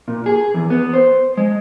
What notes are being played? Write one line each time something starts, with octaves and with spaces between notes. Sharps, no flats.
A#2
G#4
E2
B3
C5
G#3